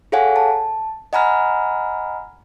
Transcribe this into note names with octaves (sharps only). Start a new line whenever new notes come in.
G#4 A4 C#5 F5 F#5 G#5
A5
D#5 F#5 G#5 A#5 B5 F6